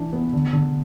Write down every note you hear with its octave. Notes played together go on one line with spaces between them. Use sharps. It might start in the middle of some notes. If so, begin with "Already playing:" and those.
Already playing: E3 D4
B3
D3
D3